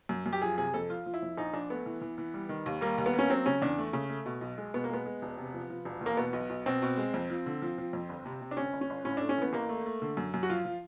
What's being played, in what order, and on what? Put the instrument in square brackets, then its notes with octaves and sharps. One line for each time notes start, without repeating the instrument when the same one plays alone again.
[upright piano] F#2
F#2
G4
F3 G#4
C3 G#4
F2 A4
F3 F4
F3
E4
F2
A#1 D#4
A#1 D4
A3 B3
E3
E3
E3
G3
D#3
D#2
G3 A#3
D#2
B3
A#3
C#4
F#3 C4
C#3 C#4
E2 D4
A3
C#3
A3
B2
B1
G#3
B2 B3
A#3
G#3 B3
G#3
E1
C3
F3
F3
E1
E2 A#3
B2 B3
B1
B1
B2 C4
B2
G#3
F2
F3
D3
F3
F3
F2
G1
C3
C3
D4
G1 C#4
G1
C#4
G1
A2 C#4
A3 D4
C#4
E3 B3
A1 A#3
A3
A3
D3
F#2
F#2
F#4
F3 F4
F3